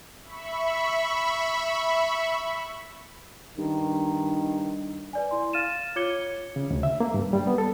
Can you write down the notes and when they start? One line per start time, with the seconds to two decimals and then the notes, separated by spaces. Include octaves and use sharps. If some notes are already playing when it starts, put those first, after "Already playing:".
0.23 E5 B5 C#6
3.58 G2 D#3
5.13 B4 D5 G#5
5.31 E4 C6
5.53 F5 F6 A6 D#7 E7
5.96 F4 C#5 D6 G#6 C#7 G7
6.56 C#3
6.71 D2
6.83 E5
7.00 A#3
7.14 G2
7.33 G3
7.47 B3
7.58 A4